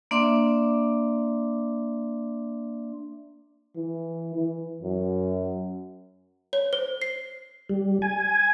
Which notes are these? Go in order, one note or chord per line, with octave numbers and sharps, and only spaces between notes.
A#3 D4 D5 E5 C6 D6
E3
E3
F#2
C#5
C5
C7
G3
G#5